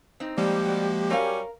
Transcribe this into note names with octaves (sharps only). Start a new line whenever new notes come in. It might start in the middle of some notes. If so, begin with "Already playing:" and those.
C4 D#4
F3 G3 G#3 A#3 G4
F#4 D5
F#2 G3 C#4 A#4 F5